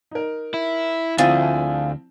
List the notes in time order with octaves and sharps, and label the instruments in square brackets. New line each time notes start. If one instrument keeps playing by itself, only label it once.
[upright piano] D#4 A#4
[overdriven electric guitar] E4
[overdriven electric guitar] D2 [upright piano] F3 C4 E4 [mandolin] F4 G#4